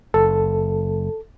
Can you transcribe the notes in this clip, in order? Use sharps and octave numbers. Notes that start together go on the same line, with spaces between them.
F#1 A4